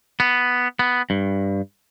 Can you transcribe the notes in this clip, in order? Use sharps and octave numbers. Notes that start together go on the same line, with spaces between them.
B3
B3
G2